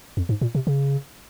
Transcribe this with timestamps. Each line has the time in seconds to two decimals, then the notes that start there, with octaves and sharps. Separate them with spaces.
0.17 F2
0.29 G#2
0.41 A#2
0.55 C3
0.67 C#3